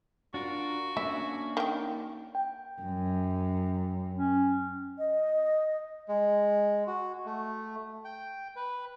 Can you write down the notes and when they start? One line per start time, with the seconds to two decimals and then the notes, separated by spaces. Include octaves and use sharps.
0.34 D4 F4 F#4 A#4
0.97 A#3 C#4 D4 E5
1.57 D#3 G5
2.35 G5
2.82 F#2
4.16 C#4
4.98 D#5
6.09 G#3
6.87 F#4
7.26 A3
8.05 G5
8.56 B4